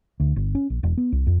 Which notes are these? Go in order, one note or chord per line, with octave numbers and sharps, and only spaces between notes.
D2
G1
C#4
A#1
E1
B3
C2
F2